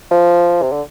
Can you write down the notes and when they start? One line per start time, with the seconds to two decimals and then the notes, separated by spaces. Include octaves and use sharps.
0.11 F3
0.62 C3
0.72 D3